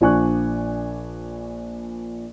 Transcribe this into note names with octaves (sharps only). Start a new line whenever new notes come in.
A#1 F3 D4 G#5 C#6 F#6